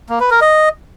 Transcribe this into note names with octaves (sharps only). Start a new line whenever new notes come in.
A#3
B4
A#4
D#5